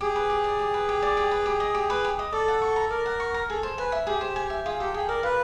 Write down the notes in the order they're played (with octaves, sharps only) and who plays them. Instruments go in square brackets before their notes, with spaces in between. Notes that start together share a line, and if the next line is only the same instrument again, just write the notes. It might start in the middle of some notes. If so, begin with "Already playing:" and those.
[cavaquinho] G4 [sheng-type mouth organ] G#4
[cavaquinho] B4
G4
D5
G4
B4
G4
D5
G4
B4
G4
D#5
G4
B4
G4
D#5
[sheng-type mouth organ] A4 [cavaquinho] D5
[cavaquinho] F#5
C#6
A#5
[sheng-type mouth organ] A#4 [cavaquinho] D5
[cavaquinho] F#5
C#6
A#5
[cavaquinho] G#4 [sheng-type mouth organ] A4
[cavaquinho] C5
[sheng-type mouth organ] B4 [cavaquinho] G#5
[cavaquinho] E5
[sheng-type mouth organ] G4 [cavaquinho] G#4
[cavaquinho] C5
G#5
E5
[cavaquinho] F4 [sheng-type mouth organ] G#4
[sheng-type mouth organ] G4 [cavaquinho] A4
[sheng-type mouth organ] G#4 [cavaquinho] G5
[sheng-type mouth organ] A#4 [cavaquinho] D5
[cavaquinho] F4 [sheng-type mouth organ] B4